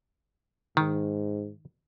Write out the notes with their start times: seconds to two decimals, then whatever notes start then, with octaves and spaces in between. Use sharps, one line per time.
0.77 G#2 D#3